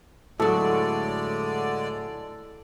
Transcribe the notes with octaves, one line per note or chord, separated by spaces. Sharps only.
A2 D3 F#3 G#3 A4 D5